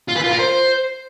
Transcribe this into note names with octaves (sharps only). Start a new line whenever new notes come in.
F4
B4
F4
A#4
C5